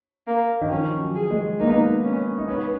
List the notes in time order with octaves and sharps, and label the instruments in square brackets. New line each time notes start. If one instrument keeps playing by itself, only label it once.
[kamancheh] A#3
[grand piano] D#3
[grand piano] F3 [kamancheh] C#4
[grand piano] F#3
[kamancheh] G#4
[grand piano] G#3
[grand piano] A#3 [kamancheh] D#4
[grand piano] B3
A#3
[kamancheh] C#4
[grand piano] D#4
[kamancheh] B3 [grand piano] C#4